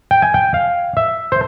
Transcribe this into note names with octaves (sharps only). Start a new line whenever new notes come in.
G5
G#5
G5
F5
E5
C5